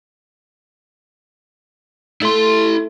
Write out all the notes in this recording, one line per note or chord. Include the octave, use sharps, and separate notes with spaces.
A3 E4 C6